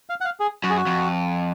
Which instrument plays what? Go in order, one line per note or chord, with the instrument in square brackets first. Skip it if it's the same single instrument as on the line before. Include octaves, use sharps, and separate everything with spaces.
[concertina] F5
F#5
F5
G#4
[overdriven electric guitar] F#2 [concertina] F#4
[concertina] G#4
F#4
[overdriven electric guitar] F2